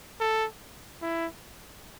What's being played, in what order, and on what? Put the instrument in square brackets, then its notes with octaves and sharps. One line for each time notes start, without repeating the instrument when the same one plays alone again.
[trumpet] A4
E4